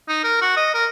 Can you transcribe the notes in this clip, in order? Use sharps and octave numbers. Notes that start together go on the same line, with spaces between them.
D#4
A#4
F#4
D#5
A#4